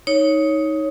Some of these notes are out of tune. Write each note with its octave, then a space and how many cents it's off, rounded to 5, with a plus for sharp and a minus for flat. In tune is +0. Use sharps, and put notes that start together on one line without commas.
D#4 +15 C#5 +0